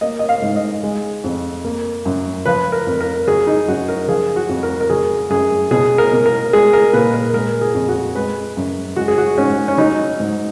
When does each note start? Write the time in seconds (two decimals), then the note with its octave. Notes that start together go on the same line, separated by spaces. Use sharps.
0.01 A#3 D#5
0.19 D#5
0.29 F5
0.42 G#2
0.56 D#5
0.83 G#3
1.24 F2
1.64 A#3
2.05 F#2
2.46 F3 B4
2.72 A#4
2.86 F2
3.01 A#4
3.27 F#3 G#4
3.47 D#4
3.68 F#2 F#4
3.89 A#4
4.08 F3 G#4
4.36 F#4
4.49 F2
4.63 A#4
4.81 A#4
4.90 F#3 G#4
5.30 F#2 G#4
5.71 B2 G#4
5.98 A#4
6.12 B2
6.26 A#4
6.53 G#3 G#4
6.73 A#4
6.93 A#2 B4
7.14 A#4
7.34 G#3 A#4
7.61 G#4
7.74 F2
7.89 F#4
8.15 G#3 B4
8.57 F#2
8.96 G#3 F#4
9.08 G#4
9.18 F#4
9.37 G#2 C#4
9.68 C#4
9.78 F#3 D#4
10.20 G#2